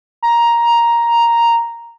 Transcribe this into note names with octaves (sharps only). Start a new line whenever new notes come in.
A#5